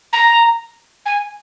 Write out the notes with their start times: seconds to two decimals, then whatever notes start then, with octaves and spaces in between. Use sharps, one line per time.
0.13 A#5
1.06 G#5